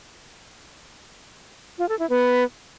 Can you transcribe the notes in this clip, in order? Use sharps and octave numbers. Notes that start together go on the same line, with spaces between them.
F4
A4
E4
B3